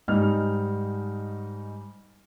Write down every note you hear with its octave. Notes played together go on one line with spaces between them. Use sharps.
G#2 G3 D#4 F6